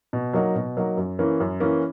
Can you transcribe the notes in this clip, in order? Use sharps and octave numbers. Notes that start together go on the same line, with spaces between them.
B2
F#3 A#3 D#4 F#4
B2
F#3 A#3 D#4 F#4
F#2
E3 A#3 C#4
F#2
E3 A#3 C#4